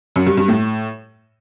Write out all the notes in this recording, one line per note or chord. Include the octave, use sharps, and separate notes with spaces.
F#2
G2
G2
A2